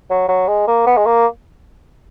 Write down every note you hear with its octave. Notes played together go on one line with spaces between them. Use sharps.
F#3
F#3
G#3
A#3
B3
G#3
A#3